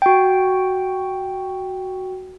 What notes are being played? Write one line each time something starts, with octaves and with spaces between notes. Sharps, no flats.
F#4 G5